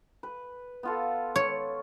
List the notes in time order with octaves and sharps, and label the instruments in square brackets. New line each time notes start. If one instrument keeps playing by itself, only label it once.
[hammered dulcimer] B4
B3 F4 A4
[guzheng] C#5